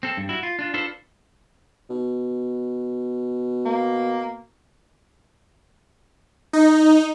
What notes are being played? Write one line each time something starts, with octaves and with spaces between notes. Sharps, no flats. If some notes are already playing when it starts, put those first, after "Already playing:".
C4 A4
G2
E4 F#4
F4
D4 F4
D4 F4 A4 B4 C5
B2
A#3
D#4